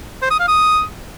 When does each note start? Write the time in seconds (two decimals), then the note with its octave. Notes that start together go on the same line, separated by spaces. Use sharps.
0.22 C5
0.31 D#6
0.39 F5
0.48 D#6